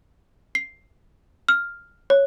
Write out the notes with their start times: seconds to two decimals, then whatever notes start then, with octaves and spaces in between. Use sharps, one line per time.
0.55 C7
1.49 F6
2.10 C#5